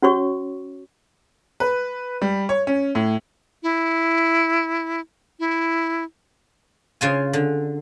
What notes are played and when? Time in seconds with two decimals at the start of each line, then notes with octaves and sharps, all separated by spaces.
0.02 C#4 F#4 C#5 C#6
1.60 B4
2.22 G3
2.49 C#5
2.67 C#4
2.95 A2
3.63 E4
5.40 E4
7.01 C#3 F4 G#5
7.33 D3